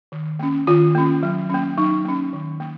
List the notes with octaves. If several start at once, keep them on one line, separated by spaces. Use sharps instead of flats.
D#3
A#3 C#4
D#3 F4
A#3 C#4
F#3
A#3 C#4
F#3 D#4
A#3 C#4
D#3
A#3